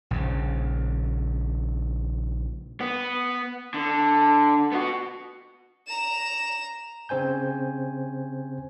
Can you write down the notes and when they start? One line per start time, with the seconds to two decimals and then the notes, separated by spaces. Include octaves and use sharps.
0.11 A#1 C#3
2.80 B3
3.74 D3
4.73 B3 F#4
5.87 A#5 E7
7.09 C#3 C4 C5 G#5 G6